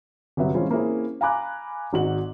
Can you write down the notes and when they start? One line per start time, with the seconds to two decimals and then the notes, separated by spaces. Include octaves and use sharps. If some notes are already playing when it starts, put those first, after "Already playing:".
0.37 G1 C3 F#3 B3 E5
0.54 E3 G#3 C4 C#4 E4 F4
0.71 A#3 C4 C#4 E4 G#4
1.21 F5 G#5 A#5 B5 D6 F#6
1.93 G#1 G#2 F#4 F#7